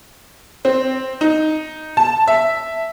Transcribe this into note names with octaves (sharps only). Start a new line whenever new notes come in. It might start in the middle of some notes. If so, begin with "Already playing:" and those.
C4
D#4
A5
E5